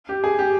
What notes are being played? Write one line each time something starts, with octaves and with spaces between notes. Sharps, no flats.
G4
G#4
G4